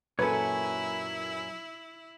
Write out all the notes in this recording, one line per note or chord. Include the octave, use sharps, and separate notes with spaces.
F#2 A#2 E4 A4 B4 C#5 G#5